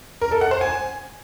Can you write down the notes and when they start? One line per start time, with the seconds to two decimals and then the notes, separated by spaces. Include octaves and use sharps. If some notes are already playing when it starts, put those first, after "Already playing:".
0.21 A#4
0.31 A4
0.41 F#5
0.51 C5
0.61 G#5